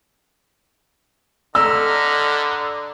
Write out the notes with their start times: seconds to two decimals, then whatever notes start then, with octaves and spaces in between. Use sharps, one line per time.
1.55 D3 A4 D5 D#5 A#5 B5 E6 F6